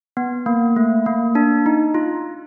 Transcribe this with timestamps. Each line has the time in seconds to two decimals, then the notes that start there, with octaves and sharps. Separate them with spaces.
0.17 B3
0.46 A#3
0.76 A3
1.06 A#3
1.35 D4
1.66 D#4
1.94 F4